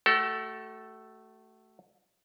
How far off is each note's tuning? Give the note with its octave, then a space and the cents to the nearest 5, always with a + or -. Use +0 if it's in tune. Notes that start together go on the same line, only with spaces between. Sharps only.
A3 +0 F#4 +40 A4 +0